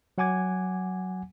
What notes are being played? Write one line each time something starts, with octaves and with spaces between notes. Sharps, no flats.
F#3 F#5 G#5 D6 G#6